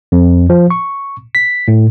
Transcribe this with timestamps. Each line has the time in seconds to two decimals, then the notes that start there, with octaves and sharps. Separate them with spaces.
0.12 F2
0.50 F3
0.70 C#6
1.35 B6
1.68 A2